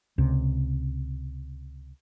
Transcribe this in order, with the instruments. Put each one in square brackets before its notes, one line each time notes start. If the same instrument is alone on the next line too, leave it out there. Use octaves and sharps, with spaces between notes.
[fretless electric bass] C#2 C3